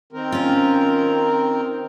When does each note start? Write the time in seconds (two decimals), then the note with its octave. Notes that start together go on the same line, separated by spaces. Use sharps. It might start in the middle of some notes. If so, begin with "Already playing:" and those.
0.12 D#3 C4 A#4
0.32 C#4 F4